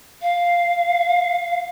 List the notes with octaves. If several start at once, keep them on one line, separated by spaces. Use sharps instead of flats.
F5